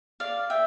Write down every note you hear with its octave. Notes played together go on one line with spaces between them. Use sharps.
D5 F5
E5 G5